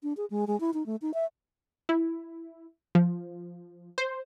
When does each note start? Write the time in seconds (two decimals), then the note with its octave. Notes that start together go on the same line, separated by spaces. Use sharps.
0.03 D4
0.17 G#4
0.30 G#3
0.47 G#3
0.60 E4
0.74 D#4
0.86 A3
1.02 D#4
1.14 E5
1.89 E4
2.95 F3
3.98 C5